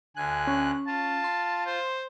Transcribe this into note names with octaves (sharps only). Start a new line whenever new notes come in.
D2 G#5 F#6
C#4
F4 A5
C6
C5